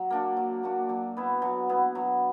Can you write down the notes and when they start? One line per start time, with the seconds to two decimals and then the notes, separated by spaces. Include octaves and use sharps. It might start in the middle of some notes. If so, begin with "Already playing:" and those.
Already playing: F#3
0.10 A#3 D4 F#4
0.37 F#3
0.63 A#3 D4 F#4
0.89 F#3
1.17 B3 E4
1.42 F#3
1.69 B3 E4
1.95 F#3